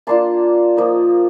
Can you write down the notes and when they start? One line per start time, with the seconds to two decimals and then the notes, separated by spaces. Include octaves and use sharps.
0.07 A#3 D4 F4 A5 C6
0.77 F3 A#3 D#4